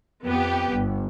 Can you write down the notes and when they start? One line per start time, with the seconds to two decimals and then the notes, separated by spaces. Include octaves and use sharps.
0.23 F2 B3 G4
0.71 G1